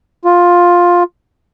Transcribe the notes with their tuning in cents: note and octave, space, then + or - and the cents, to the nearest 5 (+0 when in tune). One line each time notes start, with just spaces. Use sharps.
F4 +10